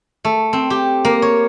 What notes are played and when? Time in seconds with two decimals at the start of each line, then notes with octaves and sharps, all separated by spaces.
0.25 A3
0.53 C4
0.70 G4
1.05 A#3
1.22 C#5